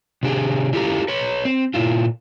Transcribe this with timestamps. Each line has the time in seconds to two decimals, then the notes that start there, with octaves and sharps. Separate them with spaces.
0.23 C3 D4 G4 G#4
0.73 D4 E4 F4 G4 A4 A#5
1.08 B4 C#5
1.45 C4
1.74 A#2 E4 F4